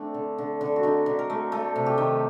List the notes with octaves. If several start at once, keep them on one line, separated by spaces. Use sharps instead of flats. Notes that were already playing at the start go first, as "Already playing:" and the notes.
Already playing: A3 C4 D4
D3
D3
D3
F#4
D3 D#4
D3
A#4
A3
A3 A4
C3
G4
D#3